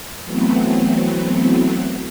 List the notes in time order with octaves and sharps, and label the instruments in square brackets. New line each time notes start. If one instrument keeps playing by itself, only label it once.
[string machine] E3 F#3 A3 B3 C4